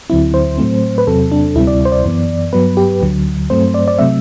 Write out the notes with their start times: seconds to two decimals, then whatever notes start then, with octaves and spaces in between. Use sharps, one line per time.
0.10 D2 D3 F#3 C4 E4
0.34 C5
0.58 A2 F#3 A3 C4
0.98 B4
1.07 E2 C3 F#3 C4 A4
1.32 D4
1.56 D2 C3 G3 C4 E4
1.67 D5
1.85 C5
1.92 D5
2.04 F#2 E3 B3
2.53 G2 F#3 B3 B4
2.77 G4
3.02 D2 D3 F#3
3.50 G2 F#3 A3 C4 C5
3.74 D5
3.88 D5
3.99 C3 F#3 A3 C4 E5